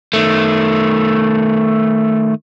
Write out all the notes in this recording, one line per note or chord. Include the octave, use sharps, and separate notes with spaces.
D#3 A3